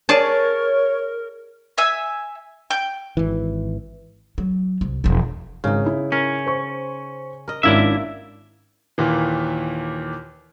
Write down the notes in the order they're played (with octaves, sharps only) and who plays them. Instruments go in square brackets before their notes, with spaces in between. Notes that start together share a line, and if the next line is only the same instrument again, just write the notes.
[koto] G#4 D5 A5 [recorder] A#4 [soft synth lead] C#5
[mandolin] E5 G#5 E6
G5
[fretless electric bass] G#1 E3
[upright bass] F#3
C2
E1 F3
[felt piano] G#1 [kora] C#3 D#4
[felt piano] E4
[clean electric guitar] C#4 [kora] A#4
[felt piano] C5 C#6
[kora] A#4 D#5
[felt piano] G#1 C#4 [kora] A#3 [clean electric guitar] D4 E4 E5
[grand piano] D#2 A#2 E3